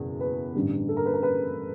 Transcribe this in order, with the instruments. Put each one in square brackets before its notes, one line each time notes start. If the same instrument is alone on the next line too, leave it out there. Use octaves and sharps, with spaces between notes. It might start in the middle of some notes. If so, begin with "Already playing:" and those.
Already playing: [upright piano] F#1 E2 B2
B4
A1 G2 D3 G3
A4
A#4
B4
A#4
B4